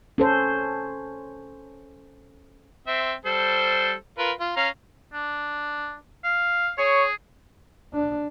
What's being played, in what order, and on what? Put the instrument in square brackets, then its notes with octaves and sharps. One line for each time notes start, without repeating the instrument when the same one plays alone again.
[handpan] C#4 A4 C5
[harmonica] C4 E5
G3 A4 C5
F4 A#4 B4
F4
C#4 F5 A#5
[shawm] D4
F5
[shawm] G#4 [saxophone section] C#5
[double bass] D4